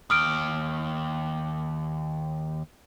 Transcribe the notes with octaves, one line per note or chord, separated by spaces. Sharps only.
D#2 D#6 F6 D7